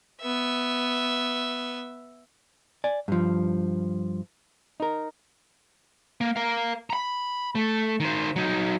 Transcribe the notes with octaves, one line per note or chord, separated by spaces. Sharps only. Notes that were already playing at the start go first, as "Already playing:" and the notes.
B3 E5
D5 G#5
G2 F3
D#4 A#4
A#3
A#4 F5
A#5 B5
A3
D#3 C5
F#3 D#4